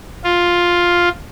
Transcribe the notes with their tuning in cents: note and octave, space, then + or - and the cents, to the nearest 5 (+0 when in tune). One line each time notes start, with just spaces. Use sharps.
F4 +5